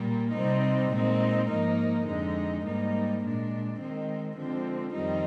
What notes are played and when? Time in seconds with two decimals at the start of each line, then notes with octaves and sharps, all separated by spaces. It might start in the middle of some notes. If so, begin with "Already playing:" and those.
Already playing: A#2 G3 A#3
0.34 C3 G3 C4 D#4
0.92 A#2 G#3 C4 D#4
1.50 G#2 F3 A#3 D#4
2.07 F2 D3 G#3 D#4
2.64 G#2 G3 A#3 D#4
3.22 A#2 G#3 D4
3.80 D#3 G#3 C4
4.37 D3 F3 G#3 C4
4.94 F2 D#3 G3 C4 D#4